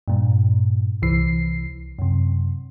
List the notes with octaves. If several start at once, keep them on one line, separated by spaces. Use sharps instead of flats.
G2 A#2
C2 E3 C7
F#2 C3